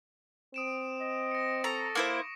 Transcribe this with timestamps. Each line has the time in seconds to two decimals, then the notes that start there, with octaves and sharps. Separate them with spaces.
0.54 C4 D#6 D7 E7
1.01 D#5
1.31 A#6 C#7
1.64 A4 A#5 C#6
1.95 A#3 E4 C5 D6